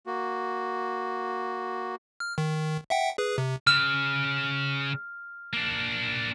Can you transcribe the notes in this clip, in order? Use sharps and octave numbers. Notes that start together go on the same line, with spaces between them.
A#3 F#4
F6
D#3
E5 F#5 G5
G#4 B4
C3
C#3 F6
A#3 D4